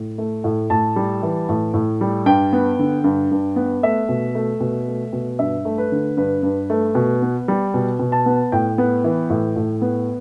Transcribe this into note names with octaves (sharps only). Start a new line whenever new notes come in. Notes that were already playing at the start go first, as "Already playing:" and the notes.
Already playing: A2
A3
A2
A2 A5
G3
E3
A2
A2
G3
G2 G5
B3
D3
G2
G2
B3
A3 E5
B2
A3
B2
A3
B2
G2 E5
A3
B4
D3
G2 B4
G2
A3
B2
B3
G3
B2
B2
A5
B3
A2 G5
B3
E3
A2
A2
B3